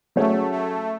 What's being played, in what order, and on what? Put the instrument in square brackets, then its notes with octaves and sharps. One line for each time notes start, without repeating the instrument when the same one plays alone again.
[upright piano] F#3 C#4 G#4 C#5 [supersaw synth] A3
[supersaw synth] A3